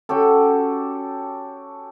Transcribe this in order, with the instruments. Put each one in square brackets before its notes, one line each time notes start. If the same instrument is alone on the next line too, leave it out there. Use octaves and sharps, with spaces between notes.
[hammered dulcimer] C#4 F#4 G4 A4